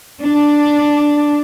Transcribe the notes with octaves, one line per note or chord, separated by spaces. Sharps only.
D4